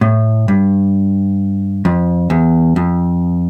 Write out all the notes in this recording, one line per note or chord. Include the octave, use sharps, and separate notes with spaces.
A2
G2
F2
E2
F2